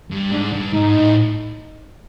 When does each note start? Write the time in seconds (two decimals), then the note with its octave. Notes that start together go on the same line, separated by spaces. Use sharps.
0.11 G2
0.31 G#2 D4
0.53 G2
0.73 G#2 D#4
0.94 A2